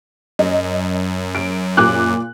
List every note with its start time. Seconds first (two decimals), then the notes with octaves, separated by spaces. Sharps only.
0.39 F#2 D#5
1.35 D7
1.77 A#2 D6 F#6